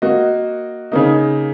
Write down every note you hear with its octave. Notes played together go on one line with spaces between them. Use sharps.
A#3 F#4 D#5
C#3 A#3 D#4